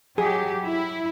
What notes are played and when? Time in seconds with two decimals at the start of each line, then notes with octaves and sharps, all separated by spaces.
0.18 F#3 G4 G#4
0.63 E4